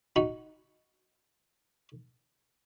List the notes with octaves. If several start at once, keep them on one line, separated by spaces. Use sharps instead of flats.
D#4 F#4 B5